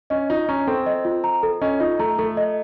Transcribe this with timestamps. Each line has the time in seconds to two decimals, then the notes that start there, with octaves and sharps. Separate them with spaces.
0.10 C#4 D#5
0.30 D#4 F4
0.49 C#4 A#5
0.67 C4 A4
0.86 D#5
1.05 F4
1.24 A#5
1.43 A4
1.61 C#4 D#5
1.80 D#4 F4
1.99 A3 A#5
2.18 A3 A4
2.37 D#5